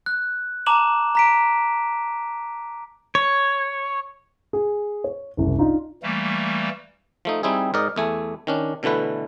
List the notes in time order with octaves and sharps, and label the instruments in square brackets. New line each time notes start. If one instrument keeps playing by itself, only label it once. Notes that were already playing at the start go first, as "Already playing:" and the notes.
[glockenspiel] F#6
A5 A#5 D6 E7 F#7
A#5 B6 D7
[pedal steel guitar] C#5
[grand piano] G#4
C#5
F#1 C2
D4 D#4 F4
[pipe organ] E3 G3 A3 A#3
[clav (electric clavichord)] F3 A3 D#4
G3 C4 D#4 E4 G#4
G#2 A#4 D5 D#5
E2 A3 G#5
D#3 C#4 D4
B2 D3 E3 A3 B4